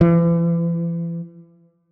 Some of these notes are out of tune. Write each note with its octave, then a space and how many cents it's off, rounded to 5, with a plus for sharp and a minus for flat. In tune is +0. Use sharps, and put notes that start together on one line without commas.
E3 +40